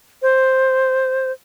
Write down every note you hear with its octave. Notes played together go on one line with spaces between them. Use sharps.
C5